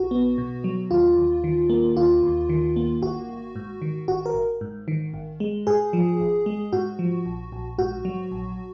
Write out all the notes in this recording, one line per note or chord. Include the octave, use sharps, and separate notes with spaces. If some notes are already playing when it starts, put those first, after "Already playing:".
Already playing: B1 F#4
B3
B2
F#3
D#2 F4
D#2
D#3
A#3
D#2 F4
D#2
D#3
A#3
G#1 F#4
G#1
G#2
D#3
G#1 F#4
A#4
G#1
G#2
D#3
G#1
G#3
G#2 G#4
F3
G#1
G#3
G#2 F#4
F3
A#1
A#1
G#2 F#4
F#3
A#1